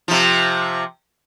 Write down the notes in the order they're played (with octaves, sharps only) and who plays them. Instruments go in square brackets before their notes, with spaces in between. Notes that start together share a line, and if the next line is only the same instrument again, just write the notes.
[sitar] C3 F3